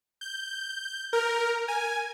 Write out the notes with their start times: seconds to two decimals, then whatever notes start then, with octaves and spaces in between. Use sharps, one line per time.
0.21 G6
1.13 A#4
1.68 G#5